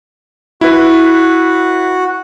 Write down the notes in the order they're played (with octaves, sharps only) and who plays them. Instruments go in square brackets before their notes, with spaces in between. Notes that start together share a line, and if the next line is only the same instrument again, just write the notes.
[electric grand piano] E4 B4 [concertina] F#4